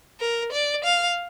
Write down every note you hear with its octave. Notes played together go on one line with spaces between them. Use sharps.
A#4
D5
F5